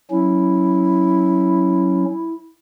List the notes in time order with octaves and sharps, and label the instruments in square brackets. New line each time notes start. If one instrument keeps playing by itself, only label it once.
[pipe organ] F#3 C#4 [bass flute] E4